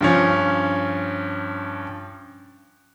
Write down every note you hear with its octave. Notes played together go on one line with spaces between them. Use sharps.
G2 F3 C#4